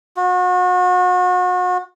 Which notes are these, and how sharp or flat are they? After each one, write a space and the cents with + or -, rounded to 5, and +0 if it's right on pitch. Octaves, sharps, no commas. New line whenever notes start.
F#4 -35